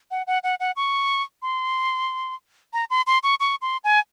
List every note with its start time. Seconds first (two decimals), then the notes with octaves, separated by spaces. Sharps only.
0.11 F#5
0.27 F#5
0.43 F#5
0.60 F#5
0.76 C#6
1.42 C6
2.73 A#5
2.90 C6
3.07 C6
3.23 C#6
3.40 C#6
3.62 C6
3.84 G#5